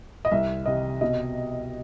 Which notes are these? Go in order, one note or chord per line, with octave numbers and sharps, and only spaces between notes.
D#5
C2 E5
C3 D#5
B2 D#5